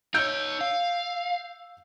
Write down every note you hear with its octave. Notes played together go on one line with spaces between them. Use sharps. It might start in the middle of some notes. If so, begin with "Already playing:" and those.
D#4 C#5 E6 G6 D7
F5